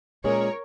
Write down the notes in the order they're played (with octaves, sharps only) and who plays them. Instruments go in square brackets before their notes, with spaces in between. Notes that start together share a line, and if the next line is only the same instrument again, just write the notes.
[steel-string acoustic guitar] A#2 G#3 C#4 G#4 [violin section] A#4 C#5